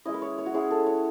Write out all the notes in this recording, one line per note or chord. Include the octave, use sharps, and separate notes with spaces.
G#3 C#4 E4 D#5
B4
C#5
C#5
F#4
G#3 C#4 E4 G#4
A4
C#5